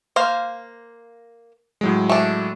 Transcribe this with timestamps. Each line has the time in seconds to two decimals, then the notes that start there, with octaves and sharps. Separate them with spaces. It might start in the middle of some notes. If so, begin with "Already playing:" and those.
0.16 A#3 C5 F5
1.81 A2 F#3 G#3
2.09 A3 D4